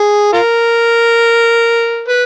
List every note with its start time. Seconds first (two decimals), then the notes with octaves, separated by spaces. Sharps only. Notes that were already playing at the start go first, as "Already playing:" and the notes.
Already playing: G#4
0.33 F4 A#4
2.08 B4